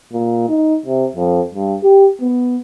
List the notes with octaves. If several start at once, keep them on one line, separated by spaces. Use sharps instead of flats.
A#2
D#4
C3
F2
G2
G4
B3